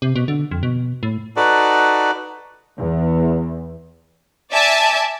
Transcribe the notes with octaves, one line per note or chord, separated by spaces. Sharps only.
C3
B2
D3
F2
B2
A2
D#4 F#4 A4 B4 D5
E2
D5 E5 G#5 A5